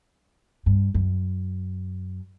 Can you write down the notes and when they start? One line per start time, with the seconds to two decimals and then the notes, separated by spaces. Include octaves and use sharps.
0.66 G2
0.94 F#2